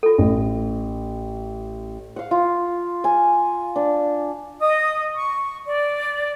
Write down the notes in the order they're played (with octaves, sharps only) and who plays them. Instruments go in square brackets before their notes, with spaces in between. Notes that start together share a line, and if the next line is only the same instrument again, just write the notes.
[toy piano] F4 A4
[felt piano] A1
[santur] F5 F#5
F4
G#5
D4
[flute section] D#5 D#6
C#6
D5